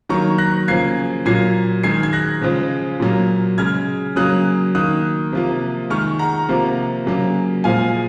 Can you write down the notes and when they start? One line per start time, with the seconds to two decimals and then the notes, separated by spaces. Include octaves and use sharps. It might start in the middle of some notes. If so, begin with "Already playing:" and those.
0.09 D#3 F#3 A#3 A#5 C#6
0.38 F#6 A#6
0.68 C#3 F3 A#3 G#6 C7
1.26 A#2 F#3 A#3 G#6 C7
1.83 D#3 G#3 G#6 C7
2.03 G#6
2.13 F#6 A#6
2.42 C#3 F3 G#3
3.00 A#2 F#3 A#3
3.58 C#3 G#3 F6 G#6
4.16 C#3 F#3 A#3 D#6 F#6
4.75 D#3 A#3 D#6 F#6
5.32 C3 F3 A#3
5.90 D#3 G#3 C#6 F6
6.19 F#5 A#5
6.49 C3 F3 A#3
7.06 C#3 F#3 A#3
7.64 A#2 F3 G#3 F5 G#5